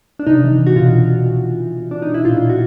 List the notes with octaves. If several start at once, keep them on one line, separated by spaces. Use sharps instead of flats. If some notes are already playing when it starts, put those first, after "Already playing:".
D4
C3 D#4
E3
E3
F#4
B2 F4
B2
B2
E3
E3
E3
B2
B2 D4
D#4
B2
E4
A#2 F4
A#2
F#4